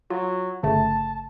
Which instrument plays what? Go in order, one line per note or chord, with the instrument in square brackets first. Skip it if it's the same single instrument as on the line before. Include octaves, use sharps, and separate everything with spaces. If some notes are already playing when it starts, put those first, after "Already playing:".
[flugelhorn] F#3 [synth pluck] F4
[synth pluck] G1 C#3 A3 [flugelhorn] A5